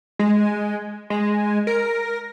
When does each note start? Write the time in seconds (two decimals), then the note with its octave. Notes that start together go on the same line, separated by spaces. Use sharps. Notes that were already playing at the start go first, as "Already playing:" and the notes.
0.19 G#3
1.10 G#3
1.67 A#4